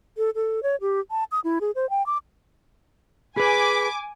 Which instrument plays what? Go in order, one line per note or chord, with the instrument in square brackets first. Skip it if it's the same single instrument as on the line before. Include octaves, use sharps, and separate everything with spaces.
[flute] A4
A4
C#5
G4
A5
D#6
E4
G#4
C5
G5
D6
[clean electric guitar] G#4 B4 [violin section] G#5 D6 [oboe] B5